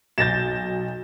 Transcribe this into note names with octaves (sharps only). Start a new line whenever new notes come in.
B1 G6 A6 A#6 E7